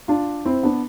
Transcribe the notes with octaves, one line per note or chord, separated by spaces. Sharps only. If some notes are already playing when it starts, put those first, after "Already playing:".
D4 F4
C4 E4
B3 D4